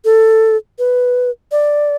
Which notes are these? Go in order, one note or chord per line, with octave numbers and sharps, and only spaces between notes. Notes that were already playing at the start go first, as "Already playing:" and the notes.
A4
B4
D5